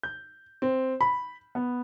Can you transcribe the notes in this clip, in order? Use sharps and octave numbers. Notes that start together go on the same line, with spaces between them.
G6
C4
B5
B3